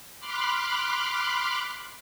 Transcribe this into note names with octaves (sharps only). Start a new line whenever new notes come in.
B5 C6 D6 F6 F#6